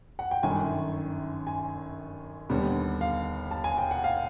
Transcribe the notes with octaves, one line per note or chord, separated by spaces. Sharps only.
F#5
G5
G1 F#2 D#3 G#5
G#5
D#2 D3 G3 B3
F5
A5
G#5
G5
F#5
F5